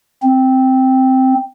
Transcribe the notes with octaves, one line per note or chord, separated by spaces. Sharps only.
C4